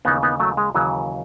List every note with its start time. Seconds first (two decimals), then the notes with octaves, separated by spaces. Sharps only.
0.05 D#2 C#3 E3 B3 D#4
0.23 B3 D#4
0.40 F#3 A3
0.57 G#3
0.74 D#2 C#3 E3 F#3